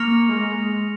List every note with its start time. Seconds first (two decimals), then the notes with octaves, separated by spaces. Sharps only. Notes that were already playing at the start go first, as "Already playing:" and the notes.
Already playing: A#3 C#6 F6 A#6 C#7 F7
0.29 G#3